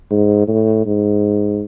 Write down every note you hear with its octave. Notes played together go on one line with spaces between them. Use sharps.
G#2
A2
G#2